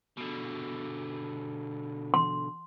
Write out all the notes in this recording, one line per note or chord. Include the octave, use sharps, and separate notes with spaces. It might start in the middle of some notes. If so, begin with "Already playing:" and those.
B2 D3
C6